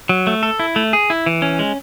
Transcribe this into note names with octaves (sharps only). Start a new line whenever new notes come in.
F#3
A3
A4
E4
A3
G#4
E4
E3
C#4
G#3